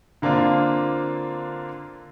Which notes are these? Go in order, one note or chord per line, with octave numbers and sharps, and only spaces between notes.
D3 A#3 C4 D4 F4